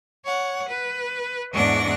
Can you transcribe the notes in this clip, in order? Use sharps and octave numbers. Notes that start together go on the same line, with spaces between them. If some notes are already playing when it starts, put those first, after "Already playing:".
C#5 F#5
B4
E2 G#2 D4 D5 C#6 A#6